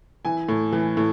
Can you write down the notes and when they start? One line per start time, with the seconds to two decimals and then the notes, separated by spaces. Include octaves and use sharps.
0.25 E3 G#5
0.49 A2
0.73 E3
0.97 A2